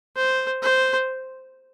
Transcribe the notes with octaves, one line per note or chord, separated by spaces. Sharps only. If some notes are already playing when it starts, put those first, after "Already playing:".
C5
C5